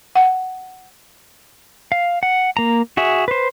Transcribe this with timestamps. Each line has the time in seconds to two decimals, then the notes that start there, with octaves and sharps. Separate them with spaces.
0.15 F#5
1.92 F5
2.23 F#5
2.57 A#3 A#5
2.97 F#4 G#4 E5
3.28 B4 C5